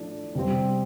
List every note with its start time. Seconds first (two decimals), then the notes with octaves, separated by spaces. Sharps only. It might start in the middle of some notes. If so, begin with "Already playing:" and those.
Already playing: A2 F3 A3 D4
0.35 C3 G3 C4